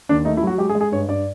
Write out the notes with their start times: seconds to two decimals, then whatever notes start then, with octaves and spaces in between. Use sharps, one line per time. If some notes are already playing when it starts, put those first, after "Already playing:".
0.09 D#2 D4
0.25 A3 D#4
0.37 E4
0.43 F#3 F#4
0.58 G#3 G4
0.69 G#4
0.75 G#3
0.81 G#4
0.92 G2 C#5
1.08 G2 D5